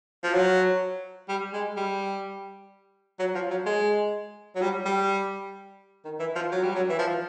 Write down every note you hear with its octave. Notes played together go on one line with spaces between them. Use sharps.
F3
F#3
G3
G#3
G3
F#3
F3
F#3
G#3
F#3
G3
G3
D#3
E3
F3
F#3
G3
F#3
E3
F3